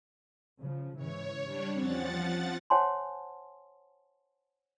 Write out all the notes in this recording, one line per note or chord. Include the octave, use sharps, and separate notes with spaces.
C#3 F3
G#2 C#3 E3 C#5
G3 D4 C#5
E2 F3 C4 C#4 F#5 A6
C5 C#5 F#5 G#5 A5 C6